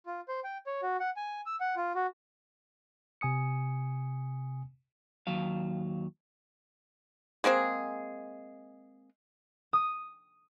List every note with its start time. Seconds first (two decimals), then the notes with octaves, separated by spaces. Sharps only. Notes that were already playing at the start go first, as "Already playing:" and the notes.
0.06 F4
0.28 C5
0.44 G5
0.67 C#5
0.82 F#4
1.00 F#5
1.16 G#5
1.46 E6
1.60 F#5
1.76 F4
1.95 F#4
3.21 C3 G#5 D#6 C#7
5.27 D#2 F#3 F5
7.44 G#3 A#3 C4 G#4
9.73 D#6